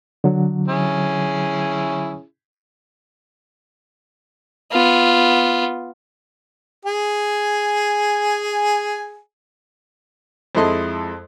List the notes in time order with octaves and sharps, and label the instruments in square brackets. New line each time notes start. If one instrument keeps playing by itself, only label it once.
[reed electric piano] D3 F#3
[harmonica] C#4 E4 G#4
[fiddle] B3 F4
[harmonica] G#4 G#5
[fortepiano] F2 G#3 E4 A4 D#5 C6